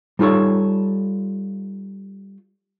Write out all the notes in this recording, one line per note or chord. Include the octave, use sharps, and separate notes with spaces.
G3 D#4 F4 A4 C#5